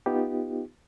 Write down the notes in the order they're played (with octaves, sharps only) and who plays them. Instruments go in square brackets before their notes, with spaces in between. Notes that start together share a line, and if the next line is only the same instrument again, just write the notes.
[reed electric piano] B3 D#4 F4 G4